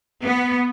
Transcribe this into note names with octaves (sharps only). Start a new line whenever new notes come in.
B3